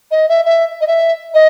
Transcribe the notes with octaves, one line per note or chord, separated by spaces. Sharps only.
D#5
E5
E5
D#5
E5
D#5